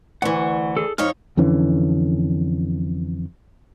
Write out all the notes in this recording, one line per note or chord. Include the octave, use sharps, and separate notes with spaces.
D2 E3 F#5 C#6
G#4 A4
F2 D#4 C#5 F6
F2 D3 E3 C#4